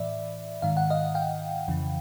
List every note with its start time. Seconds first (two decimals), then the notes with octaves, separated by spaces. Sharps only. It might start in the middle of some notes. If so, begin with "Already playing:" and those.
Already playing: A2 E3 D5 E5
0.62 G#2 D#3 F5
0.77 F#5
0.90 D#5 F5
1.15 F5 G5
1.68 F2 C#3 E3